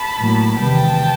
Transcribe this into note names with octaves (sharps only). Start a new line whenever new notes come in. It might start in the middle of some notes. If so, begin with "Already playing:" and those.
Already playing: A5 B5
A2 F#3 A#3
E2 C3 D#3 G#3 B3 G5 A5